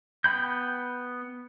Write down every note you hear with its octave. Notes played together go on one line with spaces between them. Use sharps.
B3 G5 B5 G6